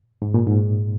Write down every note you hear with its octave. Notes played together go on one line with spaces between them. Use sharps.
G#2
A#2
G#2